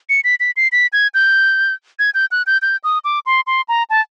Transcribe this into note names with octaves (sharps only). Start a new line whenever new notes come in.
C#7
B6
B6
C7
B6
G#6
G6
G#6
G6
F#6
G6
G6
D#6
D6
C6
C6
A#5
A5